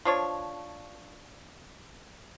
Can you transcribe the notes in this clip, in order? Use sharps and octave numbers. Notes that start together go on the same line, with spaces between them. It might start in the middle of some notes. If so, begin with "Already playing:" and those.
F3 D4 C#5